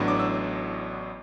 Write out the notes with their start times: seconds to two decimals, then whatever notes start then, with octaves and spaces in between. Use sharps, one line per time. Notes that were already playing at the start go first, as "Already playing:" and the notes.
Already playing: A1 A2 F#3 B3 D4
0.08 D6
0.19 E6